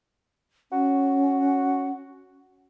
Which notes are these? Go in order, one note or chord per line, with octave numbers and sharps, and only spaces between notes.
C#4 F#4